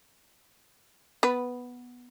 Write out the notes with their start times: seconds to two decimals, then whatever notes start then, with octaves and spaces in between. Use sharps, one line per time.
1.23 B3 B4